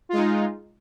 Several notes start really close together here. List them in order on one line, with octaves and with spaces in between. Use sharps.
F4 G#3 D#4